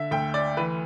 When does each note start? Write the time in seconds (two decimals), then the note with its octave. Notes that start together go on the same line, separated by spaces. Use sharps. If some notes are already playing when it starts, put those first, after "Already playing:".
Already playing: D3 E5
0.11 D2 G5
0.34 D5
0.57 E3 B4